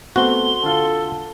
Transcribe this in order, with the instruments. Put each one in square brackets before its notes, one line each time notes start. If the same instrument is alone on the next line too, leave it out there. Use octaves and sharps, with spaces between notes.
[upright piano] A3 B3 C4 [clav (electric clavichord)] F#4 [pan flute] C6
[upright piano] D3 F4 [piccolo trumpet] A4